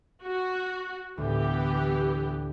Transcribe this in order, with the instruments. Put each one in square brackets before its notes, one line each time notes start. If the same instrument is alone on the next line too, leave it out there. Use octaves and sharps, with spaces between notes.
[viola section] F#4
[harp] D2 A2 [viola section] E3 B3 G4